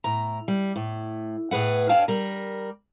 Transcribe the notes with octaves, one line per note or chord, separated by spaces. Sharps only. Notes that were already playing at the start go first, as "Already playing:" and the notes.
A2 A#5
G3
A2
A2 G#4 B4 F#5
G2 C#4 D4 F5 G5 A5
G3 A#4